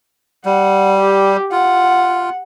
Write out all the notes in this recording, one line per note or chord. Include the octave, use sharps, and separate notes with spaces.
G3 F#5
G4
F4 F#5